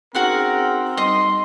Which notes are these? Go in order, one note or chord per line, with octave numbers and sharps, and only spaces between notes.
C4 C#4 D#4 F#4 G#4 A#4 F#5 C6
G3 D#4 D#5 C6 D#6